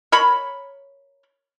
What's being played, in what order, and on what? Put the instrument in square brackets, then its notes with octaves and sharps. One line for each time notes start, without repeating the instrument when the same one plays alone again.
[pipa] A#4 C#5 B5